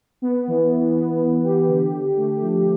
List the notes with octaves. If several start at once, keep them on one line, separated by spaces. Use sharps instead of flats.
B3
E3
E3
B3
E3
G4
D3
D3
A3
F3